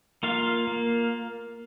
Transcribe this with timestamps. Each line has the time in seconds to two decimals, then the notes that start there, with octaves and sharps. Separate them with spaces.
0.23 A#3 F4 F5
0.67 A#3